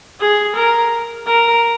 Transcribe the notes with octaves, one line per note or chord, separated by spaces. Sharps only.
G#4
A#4
A#4